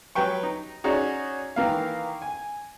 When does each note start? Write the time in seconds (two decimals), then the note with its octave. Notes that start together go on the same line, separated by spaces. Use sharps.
0.15 F#3 G4 B4 G5 C#6
0.43 D#4
0.84 C#4 D#4 F#4 G#4 C#5 D5
1.56 D#3 E3 A#3 F5
2.22 G#5